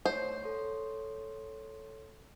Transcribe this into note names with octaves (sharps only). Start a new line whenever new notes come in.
A3 C5 C#5
A4 C#5 C6